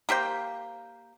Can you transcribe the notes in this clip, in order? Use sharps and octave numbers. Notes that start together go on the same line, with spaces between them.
A#3 G4 C5 G5